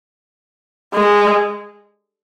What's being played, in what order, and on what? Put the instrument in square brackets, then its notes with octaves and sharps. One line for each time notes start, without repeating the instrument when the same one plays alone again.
[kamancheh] G#3